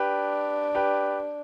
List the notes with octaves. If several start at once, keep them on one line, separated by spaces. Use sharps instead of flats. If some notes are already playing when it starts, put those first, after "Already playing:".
Already playing: D4 G4 B4
G4 B4